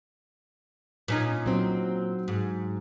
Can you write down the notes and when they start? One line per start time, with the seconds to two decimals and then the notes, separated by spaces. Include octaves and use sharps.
1.08 A#2 C#4 D#4
1.46 F#3 C4
2.28 G#2